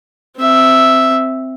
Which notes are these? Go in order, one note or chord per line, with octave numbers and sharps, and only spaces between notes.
C4 E5